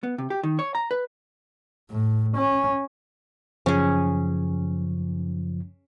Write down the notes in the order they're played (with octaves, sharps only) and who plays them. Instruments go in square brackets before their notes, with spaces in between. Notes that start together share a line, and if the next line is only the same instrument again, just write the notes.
[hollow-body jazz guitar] B3
C3
G4
D#3
C#5
A#5
B4
[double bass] A2
C#4
[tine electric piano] F#2 C#3 F3 [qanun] C#4 G#4